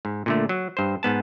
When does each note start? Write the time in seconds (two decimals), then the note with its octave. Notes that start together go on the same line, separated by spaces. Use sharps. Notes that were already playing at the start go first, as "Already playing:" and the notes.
0.05 G#2
0.26 A#2 D3 A3
0.49 F#3
0.77 G2 C5
1.03 G#2 B3 A5